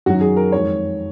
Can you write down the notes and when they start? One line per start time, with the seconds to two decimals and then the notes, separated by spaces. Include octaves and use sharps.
0.06 F#2 D#3 F#3 F#4
0.21 G#4
0.37 A#4
0.52 F2 D#3 G#3 C#5